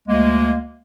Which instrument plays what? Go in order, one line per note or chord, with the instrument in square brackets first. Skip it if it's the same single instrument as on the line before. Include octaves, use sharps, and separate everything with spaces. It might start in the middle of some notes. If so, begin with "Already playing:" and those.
[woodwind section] D2 G#3 A#3